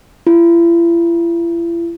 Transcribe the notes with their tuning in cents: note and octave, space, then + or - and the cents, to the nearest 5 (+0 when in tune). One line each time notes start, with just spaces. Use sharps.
E4 +45